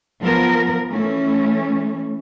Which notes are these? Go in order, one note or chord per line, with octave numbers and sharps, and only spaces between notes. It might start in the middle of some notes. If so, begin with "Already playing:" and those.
F3 B3 A#4
E3 A3 C#4